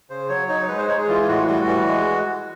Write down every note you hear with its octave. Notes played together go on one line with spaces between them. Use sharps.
C#3 C5
F#3 C#5
D#4 C#5
G#3 B4
C5
G#3 C#5
G#4
E3 F4
F4
A2 F#4
G3 F#4
E3
G#3